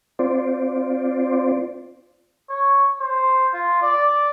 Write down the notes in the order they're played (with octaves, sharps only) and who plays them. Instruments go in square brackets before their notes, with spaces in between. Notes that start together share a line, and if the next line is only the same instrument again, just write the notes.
[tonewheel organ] C4 F4 C5 D5
[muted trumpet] C#5
C5
F4
D5